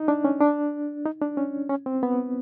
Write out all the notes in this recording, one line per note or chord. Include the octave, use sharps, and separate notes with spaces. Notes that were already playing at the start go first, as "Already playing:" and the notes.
Already playing: D#4
D4
C#4
D4
D#4
D4
C#4
C#4
C4
B3